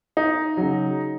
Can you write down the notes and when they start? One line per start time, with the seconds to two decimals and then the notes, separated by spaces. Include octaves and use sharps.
0.17 D#4
0.57 C#3 F#3